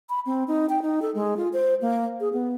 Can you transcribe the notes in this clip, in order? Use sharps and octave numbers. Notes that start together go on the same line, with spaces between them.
B5
C4
D#4
G5
D#4
A4
G#3
F4
C5
A#3
G#4
B3